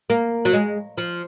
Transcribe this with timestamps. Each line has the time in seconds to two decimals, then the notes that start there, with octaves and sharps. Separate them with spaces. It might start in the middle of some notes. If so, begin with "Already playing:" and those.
0.10 A#3
0.45 F#3
0.53 G#3
0.97 F3